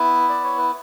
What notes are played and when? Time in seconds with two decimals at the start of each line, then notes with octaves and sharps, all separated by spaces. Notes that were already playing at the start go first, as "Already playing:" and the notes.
Already playing: B3 E4 B4
0.29 D5
0.44 C#5
0.58 B4